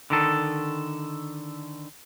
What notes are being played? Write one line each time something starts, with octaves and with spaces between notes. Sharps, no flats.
D3 D#3 A4